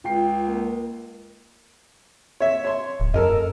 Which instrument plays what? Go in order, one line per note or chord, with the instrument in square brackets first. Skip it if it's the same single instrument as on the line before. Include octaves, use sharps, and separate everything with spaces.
[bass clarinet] C#2 [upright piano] F4 G5 C7
[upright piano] A#3
[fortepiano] C#5 E5
C#5 C6
[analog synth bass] D1
[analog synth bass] F#2 [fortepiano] A4 A#4 D#5